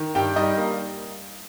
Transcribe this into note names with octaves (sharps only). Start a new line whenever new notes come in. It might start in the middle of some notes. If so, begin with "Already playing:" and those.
Already playing: D#3
G2 G4 G5
G3 D#4 D#5
A#3